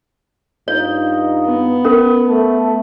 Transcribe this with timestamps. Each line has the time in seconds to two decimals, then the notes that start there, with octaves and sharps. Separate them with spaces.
0.68 G2 D#4 F4 C#5
1.46 B3
1.85 C#4 A#4
2.26 A3